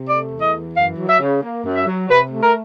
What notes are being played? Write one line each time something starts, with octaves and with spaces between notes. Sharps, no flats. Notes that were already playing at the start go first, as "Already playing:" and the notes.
Already playing: C3
A3 D5
E2
D#5
E3
F#2 F5
F#3
E5
C#3
A#3
F#2
E5
F#3
C3 B4
A3
A#4